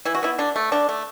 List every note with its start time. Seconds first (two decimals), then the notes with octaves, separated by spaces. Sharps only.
0.05 E3 E4
0.15 F#4
0.23 B3 E4
0.38 D3 D4
0.56 A3
0.72 D3 D4
0.89 A3